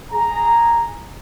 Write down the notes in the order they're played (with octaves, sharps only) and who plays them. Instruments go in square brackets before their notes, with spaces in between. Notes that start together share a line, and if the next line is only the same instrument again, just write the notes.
[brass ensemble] G#4 A#5